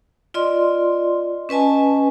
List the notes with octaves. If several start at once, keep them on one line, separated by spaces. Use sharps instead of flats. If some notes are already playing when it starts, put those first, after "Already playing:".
F4 D5 D#5 C6
C#4 B4 D#5 G#5 A5